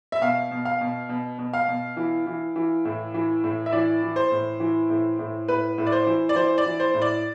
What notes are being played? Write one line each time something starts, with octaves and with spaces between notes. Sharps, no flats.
E5
B2 F5
B2
F5
B2
B2
B2
F5
B2
E3
E3
E3
A2
E3
A2
E5
E3 D5
E3
C5
A2
E3
A2
A2
A2 B4
A2
D5
C5
E3
D5
E3 C5
D5
E3
C5
A2
D5